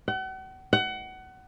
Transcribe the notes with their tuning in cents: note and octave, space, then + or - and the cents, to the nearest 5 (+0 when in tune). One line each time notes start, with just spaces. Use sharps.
F#5 +40
F#5 +25